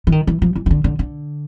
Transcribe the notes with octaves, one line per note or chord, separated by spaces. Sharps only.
E3
D#3
E3
F3
E3
D#3
D3
D3
D3